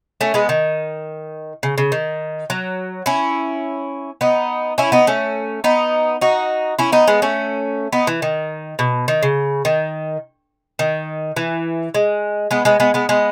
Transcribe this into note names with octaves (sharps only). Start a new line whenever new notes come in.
A3 C#4
G#3 B3
D#3
C#3
C#3
D#3
F#3
C#4 E4
B3 D#4
C#4 E4
B3 D#4
A3 C#4
B3 D#4
D#4 F#4
C#4 E4
B3 D#4
G#3 B3
A3 C#4
B3 D#4
E3
D#3
B2
D#3
C#3
D#3
D#3
E3
G#3
G#3 B3
G#3 B3
G#3 B3
G#3 B3
G#3 B3